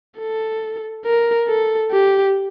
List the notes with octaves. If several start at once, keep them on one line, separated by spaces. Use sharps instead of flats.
A4
A#4
A4
G4